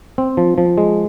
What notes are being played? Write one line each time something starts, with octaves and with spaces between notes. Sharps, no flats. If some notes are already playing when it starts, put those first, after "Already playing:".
C4
F3
F3
G#3